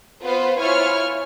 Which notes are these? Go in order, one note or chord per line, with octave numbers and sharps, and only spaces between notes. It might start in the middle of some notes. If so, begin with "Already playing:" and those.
B3 F4 B4 C5
E4 F4 C#5 G#5 C#6 F6